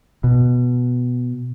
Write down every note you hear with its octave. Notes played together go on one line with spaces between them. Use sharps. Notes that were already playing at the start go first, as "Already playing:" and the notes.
B2